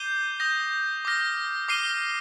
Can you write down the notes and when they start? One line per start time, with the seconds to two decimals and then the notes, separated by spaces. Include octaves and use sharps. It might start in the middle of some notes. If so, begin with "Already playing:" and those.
Already playing: D6 G6 C7 D#7 G7
0.40 D#6 G6 A#6
1.05 D6 F6 A#6
1.68 D6 F6 C7 D#7 G7